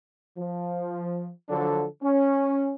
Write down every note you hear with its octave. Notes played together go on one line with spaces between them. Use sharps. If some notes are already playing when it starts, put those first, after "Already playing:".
F3
D3 F3 F#3 D4 A4
C#4